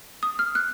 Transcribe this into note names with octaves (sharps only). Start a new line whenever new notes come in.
D#6
F6
F#6